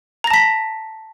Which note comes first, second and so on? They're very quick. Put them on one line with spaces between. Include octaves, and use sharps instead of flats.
A#5 A#6 A5 B6